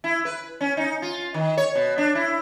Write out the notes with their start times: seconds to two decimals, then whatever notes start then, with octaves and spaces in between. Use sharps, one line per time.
0.04 E4
0.25 B4
0.61 C#4
0.77 D#4
1.02 F4
1.34 D#3
1.57 C#5
1.75 B2
1.98 D4
2.15 E4